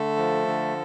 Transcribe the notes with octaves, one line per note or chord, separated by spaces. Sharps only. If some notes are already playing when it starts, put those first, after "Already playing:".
Already playing: D3 A3 A4
F3
D3